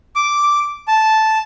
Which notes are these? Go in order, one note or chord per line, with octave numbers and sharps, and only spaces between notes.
D6
A5